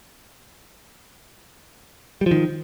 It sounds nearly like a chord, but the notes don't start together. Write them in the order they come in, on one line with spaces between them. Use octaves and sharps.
G3 F3 D#3